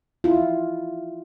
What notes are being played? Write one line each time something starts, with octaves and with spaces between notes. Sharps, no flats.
E4 F4